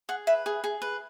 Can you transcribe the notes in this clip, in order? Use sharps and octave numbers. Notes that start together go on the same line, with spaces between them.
G#4 F#5
B4 E5
G#4
G#4
B4